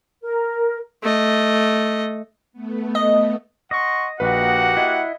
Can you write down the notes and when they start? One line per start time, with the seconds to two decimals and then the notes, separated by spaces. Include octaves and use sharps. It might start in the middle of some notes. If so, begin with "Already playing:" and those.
0.22 A#4
1.03 A3 D#5
2.53 A3 B3
2.95 D#5
3.71 D#5 F#5 C6 C#6
4.20 A#1 A#3 F#4 G4 B4 F#5
4.77 E4 D#5